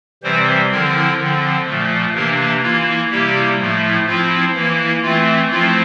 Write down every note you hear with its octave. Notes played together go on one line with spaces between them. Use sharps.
C3 E3 G3 C4 C5
D3 F3 C4 E4 A#4
D3 F3 C4
A#2 F3 A3
C3 E3 A#3 D4 A#4
E3 A#3 E4 F4
C3 G3 A#3 E4 G4
A2 F3 A3 E4
F3 C4 E4 F4
E3 A#3 E4
E3 A3 C4 F4
F3 A3 C4 E4 F4